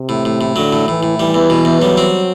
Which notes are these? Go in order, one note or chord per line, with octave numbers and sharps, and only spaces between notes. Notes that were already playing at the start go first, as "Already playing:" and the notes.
Already playing: C3
A2
A2
A2
D3 F#3
A2
A2 E3
A2
E3 G3
E2
B2
E2
F#3 G3
C4